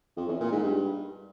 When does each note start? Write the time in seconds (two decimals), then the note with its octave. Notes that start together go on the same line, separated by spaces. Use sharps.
0.17 F2
0.28 E2
0.40 A#2
0.52 G#2
0.63 G2